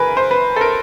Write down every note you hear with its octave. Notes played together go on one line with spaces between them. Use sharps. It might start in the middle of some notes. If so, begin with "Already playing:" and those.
Already playing: E3 G#4 A#4 B4
C5
B4
A4
A#4